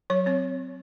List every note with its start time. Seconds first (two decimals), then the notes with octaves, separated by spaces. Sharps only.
0.10 F#3 C#5
0.26 C4 C#5